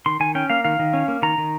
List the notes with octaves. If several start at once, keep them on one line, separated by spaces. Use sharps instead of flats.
D#3 C6
D#3 G#5
C#4 G5
A#3 F5
D#3 F5
D#3
C#4
A#3
D#3 A#5
D#3